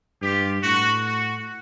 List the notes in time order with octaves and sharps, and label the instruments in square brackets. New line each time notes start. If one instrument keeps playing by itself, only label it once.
[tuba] G2 [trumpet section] F4 G4
[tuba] A2 [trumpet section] F#4
[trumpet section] F#4